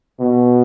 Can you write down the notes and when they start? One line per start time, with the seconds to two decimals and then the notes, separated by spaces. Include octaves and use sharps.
0.20 B2